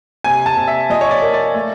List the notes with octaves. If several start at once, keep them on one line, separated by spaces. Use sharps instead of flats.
C3 G#5
A5
C3
E5
F3 D#5
C#5
D5
A#3
D5
A3